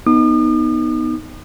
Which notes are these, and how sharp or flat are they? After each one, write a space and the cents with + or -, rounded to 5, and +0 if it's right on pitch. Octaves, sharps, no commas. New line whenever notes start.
B3 +0 D#4 +0 D#6 -45